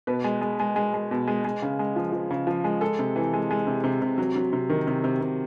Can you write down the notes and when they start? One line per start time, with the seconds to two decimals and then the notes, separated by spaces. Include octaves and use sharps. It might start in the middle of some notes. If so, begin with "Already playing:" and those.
0.07 B2 B4
0.24 G#3
0.41 G#3
0.60 G#3
0.76 G#3
0.94 G#3
1.11 B2
1.27 G#3
1.45 G#3
1.62 C#3
1.79 G#3
1.96 F3
2.13 F3
2.30 C#3
2.47 F3
2.64 G#3
2.81 G#3 A4
2.99 C3
3.16 E3
3.33 G#3
3.51 G#3
3.67 C3
3.84 C3
4.02 C3
4.18 F#3
4.36 F#3
4.53 C3
4.69 D#3
4.87 C3
5.04 C3
5.21 C3